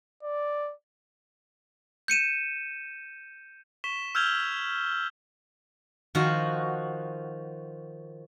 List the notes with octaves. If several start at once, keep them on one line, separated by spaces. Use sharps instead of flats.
D5
G6 C#7 D#7 E7
C#6 B6 E7 G7
E6 F6 G6 G#6 F7 G7
D#3 F3 F#4